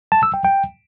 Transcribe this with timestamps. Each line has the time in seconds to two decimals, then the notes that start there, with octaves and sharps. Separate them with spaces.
0.12 A5
0.23 E6
0.34 G5
0.44 G5